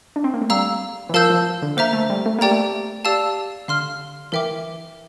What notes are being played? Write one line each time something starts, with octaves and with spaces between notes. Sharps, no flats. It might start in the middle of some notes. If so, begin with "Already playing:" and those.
D4
C4
A#3
A3
G3 F5 A#5 E6
E3
F3 A#4 F5 A5 E6 G6
F3
D3
A#3 C5 E5 A#5
A3
G3
A3
A#3 G4 D5 G5 A#5
A3
G4 D5 F5 A5 E6
D3 F5 C6 F6
E3 A#4 E5 G5 D6